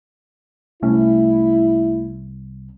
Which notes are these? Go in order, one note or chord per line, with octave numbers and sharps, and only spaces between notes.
C2 A3 C#4 E4